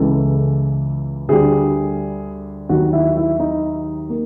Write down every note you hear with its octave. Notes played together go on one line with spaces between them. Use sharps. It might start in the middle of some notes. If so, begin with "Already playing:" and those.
Already playing: C#2 C#3 E3 G#3 A4
D2 D3 G3 G#4
D#2 D#3 F#3 F#4
E4
E4
D#4
A#3